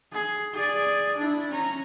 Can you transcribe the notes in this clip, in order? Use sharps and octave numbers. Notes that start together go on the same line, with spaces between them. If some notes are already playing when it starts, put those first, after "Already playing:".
G#4
G#4 D5
D4 E4
C#4 A#5